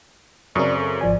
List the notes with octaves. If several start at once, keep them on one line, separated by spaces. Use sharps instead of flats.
F#2 C#3 C4 A#4 D5 C#6 D#6
A4
G#1 F3 D5 G#5